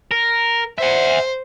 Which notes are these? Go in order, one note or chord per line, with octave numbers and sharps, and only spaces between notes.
A#4
C5 E5 F#5